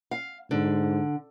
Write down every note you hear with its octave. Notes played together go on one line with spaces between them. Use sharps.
F5
G#2 D3